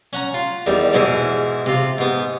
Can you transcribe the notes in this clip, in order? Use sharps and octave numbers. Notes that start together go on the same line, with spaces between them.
C#4 F#5 A#5
F4
E2 D#3 G3
G#2 B2 E3 G#3 E4
C3 F4
G#2 B3